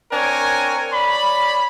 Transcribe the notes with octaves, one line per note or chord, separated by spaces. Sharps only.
C4 D4 A#4 C#5 G#5
C#5 D5 B5